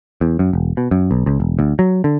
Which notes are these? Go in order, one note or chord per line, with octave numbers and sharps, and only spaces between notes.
E2
F#2
E1
B2
F#2
B1
C#2
E1
D2
F#3
D3